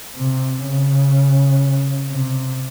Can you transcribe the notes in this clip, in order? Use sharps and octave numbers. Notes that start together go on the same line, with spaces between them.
C3
C#3
C3